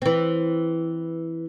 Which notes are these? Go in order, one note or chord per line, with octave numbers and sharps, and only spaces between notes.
E3 C4